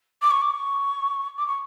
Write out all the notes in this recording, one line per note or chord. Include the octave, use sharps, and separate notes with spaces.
D6
C#6
D6
C#6
D6
C#6